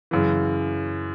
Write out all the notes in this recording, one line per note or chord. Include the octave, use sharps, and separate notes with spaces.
F#2 C#3 E3